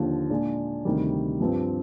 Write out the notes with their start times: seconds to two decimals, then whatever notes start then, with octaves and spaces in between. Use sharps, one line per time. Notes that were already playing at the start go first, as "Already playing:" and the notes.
Already playing: D#2 D3 F3
0.30 A#2 G#3 D4
0.85 D2 C3 D#3 G3
1.40 G2 F3 C4